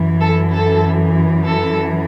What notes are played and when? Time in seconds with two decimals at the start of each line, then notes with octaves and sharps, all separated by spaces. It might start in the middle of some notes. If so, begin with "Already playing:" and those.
Already playing: F#2 E3
0.21 A4
0.53 A4
1.47 A4